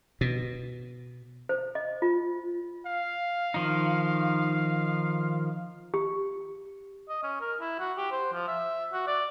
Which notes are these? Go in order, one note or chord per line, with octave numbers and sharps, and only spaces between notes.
B2
C5
D#5
F4
F5
D#3 F3 D#4
G4
D#5
C#4
A#4
E4
F#4
G4
C5
F3
E5
F#4
D5